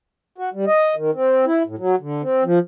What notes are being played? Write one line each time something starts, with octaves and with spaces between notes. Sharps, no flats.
F#4
G3
D#5
D#3
C4
E4
A2
F#3
D3
C4
F3